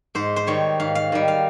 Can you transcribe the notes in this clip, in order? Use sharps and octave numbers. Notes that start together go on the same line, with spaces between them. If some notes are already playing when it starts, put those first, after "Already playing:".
G#2 C5
C5
D#3 G3 C#5
G#2 F5
F5
D#3 G3
F5